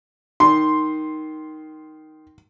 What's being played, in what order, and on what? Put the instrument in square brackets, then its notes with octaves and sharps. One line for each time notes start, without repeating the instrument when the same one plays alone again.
[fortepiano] D#3 [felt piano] C6